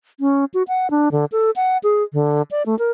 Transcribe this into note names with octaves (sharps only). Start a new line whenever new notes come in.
C#4
F#4
F#5
D4
D3
A4
F#5
G#4
D3
D5
A3
A#4